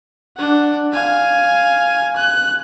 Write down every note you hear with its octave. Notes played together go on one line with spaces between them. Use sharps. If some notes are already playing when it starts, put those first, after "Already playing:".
D4 F#5
F5 G#5
F#6